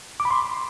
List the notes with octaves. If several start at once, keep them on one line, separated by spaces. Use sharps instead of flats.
D6
B5
C6